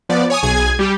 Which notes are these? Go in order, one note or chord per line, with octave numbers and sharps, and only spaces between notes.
F3 B3 D5
C#5 G#5 D#6
B1 G#4 G#5 G#6
G3 G4